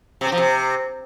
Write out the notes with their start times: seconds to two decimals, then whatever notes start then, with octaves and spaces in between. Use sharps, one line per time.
0.21 C3
0.27 C4
0.32 F3
0.38 C3